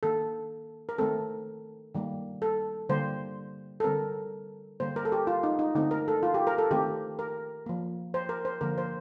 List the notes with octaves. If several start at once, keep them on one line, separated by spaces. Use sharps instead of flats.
D#3 A#3 A4
A#4
D#3 A3 C4 A4
D#3 G3 A#3
A4
D3 G3 A#3 C5
A4
D3 G3 C4 A#4
D3 G3 A#3 C5
A#4
A4
G4
F4
D#4
D#4
D3 A3 C4 D#4
A#4
A4
F4
G4
A#4
A4
D#3 A3 C4 G4
A#4
F3 A#3
C5
A#4
C5
D3 F3 A#3 A#4
C5